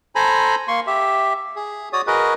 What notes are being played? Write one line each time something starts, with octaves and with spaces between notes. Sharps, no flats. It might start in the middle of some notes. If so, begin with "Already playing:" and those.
A4 C5 G#5 A#5 B5
A#3 C6 C#6
G4 E5
G#4
F#4 C#5 D5 D#6
F#4 G#4 A#4 B4 D#5